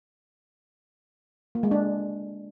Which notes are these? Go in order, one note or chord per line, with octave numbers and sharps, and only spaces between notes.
A#3
G#3
D4